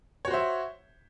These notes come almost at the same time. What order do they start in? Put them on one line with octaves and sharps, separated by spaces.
C#5 F#4 C5 E5